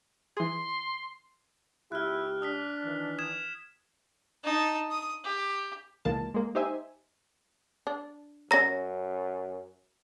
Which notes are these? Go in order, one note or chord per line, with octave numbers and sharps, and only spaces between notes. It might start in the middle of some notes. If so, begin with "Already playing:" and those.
E3 G#4 C6
C#2 E4 G4 F6 F#6
D4 D#6 F6 B6
D#3 E3
D#6 G#6 E7
D#4 A5
D#6
G4
C#2 B2 E3 G#3 A#3 A5
G#3 A#3
D#4 G4 C5 E5 G#5
D4
F#2 C#4 C#5 A#5 A#6